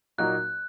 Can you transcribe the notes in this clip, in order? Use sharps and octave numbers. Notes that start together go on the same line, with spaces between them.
A#2 F#3 A#3 D#4 F#4 F#6